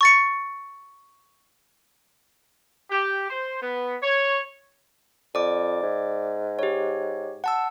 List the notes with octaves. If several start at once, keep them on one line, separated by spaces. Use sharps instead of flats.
C#6 A6 C#7
G4
C5
B3
C#5
F2 D5 D6
G#2
G4 C#5
F#5 A5 E6